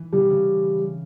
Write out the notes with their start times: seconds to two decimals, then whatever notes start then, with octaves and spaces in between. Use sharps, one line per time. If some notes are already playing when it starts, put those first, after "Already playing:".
Already playing: E3
0.12 C#3 G3
0.21 C3
0.30 C#3